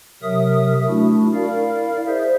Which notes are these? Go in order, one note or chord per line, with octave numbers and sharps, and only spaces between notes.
C3 F#3 A#4 E5 D#6
A3 D4 E4 F#4
E4 A#4 D5 F5
G#4 C5 E5